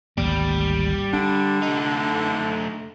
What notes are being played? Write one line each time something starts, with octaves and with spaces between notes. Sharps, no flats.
G#1 D2 G3 A#3
D3 D4
A3 D#4